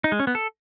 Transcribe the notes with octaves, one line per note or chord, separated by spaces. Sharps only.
D#4
G#3
C#4
B3
A4